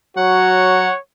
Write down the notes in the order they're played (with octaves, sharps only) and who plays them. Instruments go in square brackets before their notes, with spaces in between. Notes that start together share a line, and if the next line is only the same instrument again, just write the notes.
[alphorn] F#3 [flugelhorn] F#4 [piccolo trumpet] C#5 [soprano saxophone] F#5